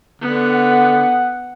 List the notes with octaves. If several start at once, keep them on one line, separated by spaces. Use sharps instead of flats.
D3 B3
F#5